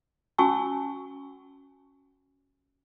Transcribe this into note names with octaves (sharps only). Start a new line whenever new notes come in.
C#4 F#4 G#5 A5 C#6 E6